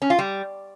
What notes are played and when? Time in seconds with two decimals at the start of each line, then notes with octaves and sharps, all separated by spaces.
0.02 C#4
0.10 F4
0.19 G3